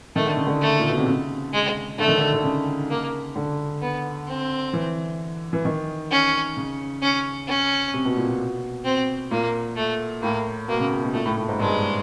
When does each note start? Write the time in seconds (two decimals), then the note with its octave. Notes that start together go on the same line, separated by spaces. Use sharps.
0.16 D#3 A3
0.26 D3
0.37 C#3
0.47 D3
0.61 A3
0.79 A#2
0.88 B2
0.98 C3
1.07 C#3
1.53 G#3
1.99 D3 A3
2.08 D#3
2.18 D3
2.33 D3
2.44 C#3
2.90 A#3
3.36 D3
3.82 B3
4.27 C4
4.73 E3
5.53 E3
5.65 D#3
6.11 C#4
6.57 C#3
7.02 C#4
7.48 C#4
7.94 C3
8.05 B2
8.17 A#2
8.28 B2
8.85 C4
9.31 A#2 A#3
9.77 A3
10.22 A2 A#3
10.68 B2 A#3
10.80 C#3
11.02 B2
11.13 A#2 A3
11.26 A2
11.37 A2
11.49 G#2
11.60 G2 G#3